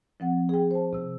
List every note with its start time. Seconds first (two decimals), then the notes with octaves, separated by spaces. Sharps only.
0.20 F3 C4 F#5
0.49 G#4 G5
0.71 C5 A5
0.93 C3 E6